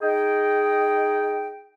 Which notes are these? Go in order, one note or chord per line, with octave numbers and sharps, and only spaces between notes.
D#4 G#4 D#5 G5